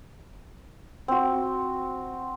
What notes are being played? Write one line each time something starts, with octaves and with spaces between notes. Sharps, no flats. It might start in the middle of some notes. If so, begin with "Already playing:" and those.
C4 F#4